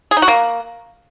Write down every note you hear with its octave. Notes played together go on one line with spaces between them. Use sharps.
G#4
D#4
F#4
A#3